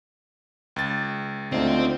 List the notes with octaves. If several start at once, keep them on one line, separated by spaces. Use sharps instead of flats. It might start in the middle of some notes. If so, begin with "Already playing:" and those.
C#2 A6
D2 A3 C4 D#4 F4